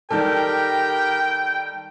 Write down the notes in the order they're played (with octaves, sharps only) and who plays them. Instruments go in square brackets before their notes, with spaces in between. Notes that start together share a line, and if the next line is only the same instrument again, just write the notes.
[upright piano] D#3 G3 A4 [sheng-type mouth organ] G4 A#4 [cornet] G5